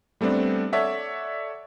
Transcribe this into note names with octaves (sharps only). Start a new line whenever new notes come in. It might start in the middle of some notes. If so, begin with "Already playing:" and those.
G3 A3 B3 C4 D4
A4 C#5 D5 E5 F#5